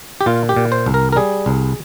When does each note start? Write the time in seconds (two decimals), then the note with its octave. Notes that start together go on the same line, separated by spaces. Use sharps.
0.21 G4
0.26 A#2 F4
0.49 G4
0.56 A#2
0.72 C5
0.86 C2
0.94 A#4
1.12 A#4
1.16 G3 G#4
1.46 C2